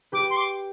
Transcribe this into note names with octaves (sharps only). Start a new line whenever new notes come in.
G4 B4 D6
C6
D6